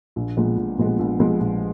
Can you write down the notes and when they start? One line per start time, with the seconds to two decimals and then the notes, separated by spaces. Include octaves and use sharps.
0.16 A#1
0.37 A#2 F3 G#3 B3
0.57 A#1
0.78 A#2 F3 G#3 B3
0.99 A#1
1.20 A#2 F3 G#3 B3
1.40 A#1